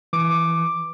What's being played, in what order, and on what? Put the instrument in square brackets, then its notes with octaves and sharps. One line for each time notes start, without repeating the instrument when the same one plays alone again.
[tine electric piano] E3 [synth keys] D6